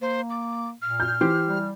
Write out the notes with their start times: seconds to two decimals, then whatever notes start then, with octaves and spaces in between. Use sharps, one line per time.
0.02 A#3 C5
0.30 D6
0.82 A#2 F6
1.00 G6
1.21 E3 G4 C5
1.46 G3